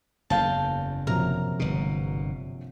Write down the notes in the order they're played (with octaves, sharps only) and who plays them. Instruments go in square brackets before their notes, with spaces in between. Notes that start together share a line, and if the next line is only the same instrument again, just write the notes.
[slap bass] F#1 E2 [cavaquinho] F5 G5 A5
[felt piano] A#1 C3 F#3 [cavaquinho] A#4 A#5
[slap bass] G1 B2